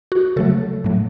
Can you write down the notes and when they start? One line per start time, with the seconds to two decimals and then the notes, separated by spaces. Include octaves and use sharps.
0.12 F#4
0.36 C#3 F#3 A3 A4
0.84 A2 F#3 A3